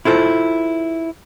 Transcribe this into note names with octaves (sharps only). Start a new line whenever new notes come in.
E4 F4 A4 C5